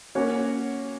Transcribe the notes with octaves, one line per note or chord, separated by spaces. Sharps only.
A#3 C#4 F#4 C#5